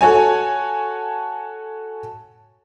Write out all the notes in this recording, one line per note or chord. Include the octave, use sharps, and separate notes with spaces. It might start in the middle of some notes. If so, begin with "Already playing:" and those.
F#4 A4 C#5 G#5